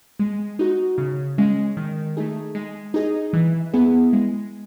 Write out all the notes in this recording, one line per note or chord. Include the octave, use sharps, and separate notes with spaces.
G#3
D#4 F#4
C#3
G#3 C#4
D#3
A3 D#4 G#4
G#3
D#4 G#4 D#5
E3
B3 E4 G#4
G#3